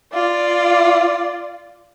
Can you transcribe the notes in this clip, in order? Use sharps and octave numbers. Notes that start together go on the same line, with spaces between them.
F4 D5